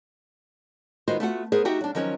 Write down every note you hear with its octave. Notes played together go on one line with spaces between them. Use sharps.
D#3 G#3 B3 F4 F#4 C5
A3 B3 F4 F#4 B4 F#5
B3 G#4 A#4 C5
D#4 F#4 G4 E5 F#5 G5
F#3 D4
D#3 F3 F#3 C#4 C#5